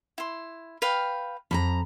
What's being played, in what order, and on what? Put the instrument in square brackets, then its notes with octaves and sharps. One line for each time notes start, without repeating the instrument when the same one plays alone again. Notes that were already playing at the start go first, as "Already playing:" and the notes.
[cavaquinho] E4 C6
B4 F5 G5
[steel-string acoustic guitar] F2 G4 A#5 [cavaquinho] B5